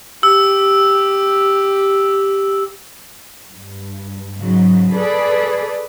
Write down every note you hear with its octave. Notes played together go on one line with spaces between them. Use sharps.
G4 E6
G2
G#2 C#3 F#3
G#4 A4 B4 D5